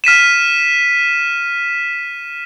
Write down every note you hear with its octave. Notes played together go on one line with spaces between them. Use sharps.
F6 B6 D#7 E7